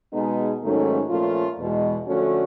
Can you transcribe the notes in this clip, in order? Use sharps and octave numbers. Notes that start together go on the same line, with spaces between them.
B2 G#3 B3 D#4 G#4
G#2 D#3 F#3 A3 C#4
A#2 F3 A3 C#4 F4
E2 B2 G#3
D3 F3 A3 C#4 F#4